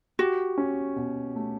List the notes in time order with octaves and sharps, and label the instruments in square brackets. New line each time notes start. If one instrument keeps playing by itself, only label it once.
[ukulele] F#4 [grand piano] G4
[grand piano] C#4
B2
A3